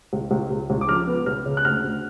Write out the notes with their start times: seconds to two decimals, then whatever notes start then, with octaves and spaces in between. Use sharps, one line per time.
0.13 C#2
0.31 C#2
0.51 C#2
0.70 C#2
0.81 D6
0.88 F3 F6
1.07 B3
1.26 C#2 F6
1.46 C#3
1.57 F#6
1.65 D2 F6
1.84 D2